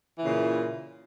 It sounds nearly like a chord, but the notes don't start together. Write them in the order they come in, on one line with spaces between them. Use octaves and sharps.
E3 A#2 C#3